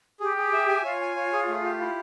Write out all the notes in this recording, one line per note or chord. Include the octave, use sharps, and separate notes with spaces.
G4 G#4
G#4
E5
G#5
F4 C#5
G#5
C#5
G#4
A3
G4
E4